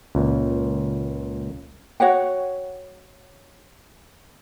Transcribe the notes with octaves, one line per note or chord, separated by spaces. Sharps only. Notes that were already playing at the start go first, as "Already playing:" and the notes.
C#2 A#2
F#4 C#5 F#5 G5